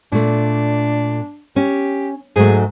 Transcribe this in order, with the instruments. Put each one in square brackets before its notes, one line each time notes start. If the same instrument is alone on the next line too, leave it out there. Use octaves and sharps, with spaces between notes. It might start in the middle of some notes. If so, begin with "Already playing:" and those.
[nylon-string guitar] A#2 A3 [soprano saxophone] D4
[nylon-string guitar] C#4 [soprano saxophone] G4
[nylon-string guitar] G#2 F#3 A3 [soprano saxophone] G#4